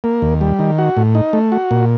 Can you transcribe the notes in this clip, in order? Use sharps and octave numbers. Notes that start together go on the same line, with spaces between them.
A#3
D#2
G3
D#3
F#4
A2
D#4
A3
F#4
A#2